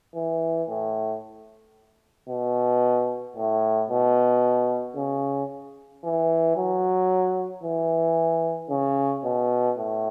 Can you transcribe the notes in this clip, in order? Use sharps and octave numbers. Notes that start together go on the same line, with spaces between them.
E3
A2
B2
A2
B2
C#3
E3
F#3
E3
C#3
B2
A2